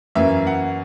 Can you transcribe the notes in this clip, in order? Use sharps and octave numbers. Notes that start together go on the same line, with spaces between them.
F#2 E3 A#3 E5
F#5